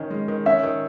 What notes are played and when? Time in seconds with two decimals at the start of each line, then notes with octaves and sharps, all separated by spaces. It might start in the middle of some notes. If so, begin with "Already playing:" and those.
Already playing: D#3 C#4
0.10 G#3
0.28 D#3
0.46 C#4 E5
0.63 D#3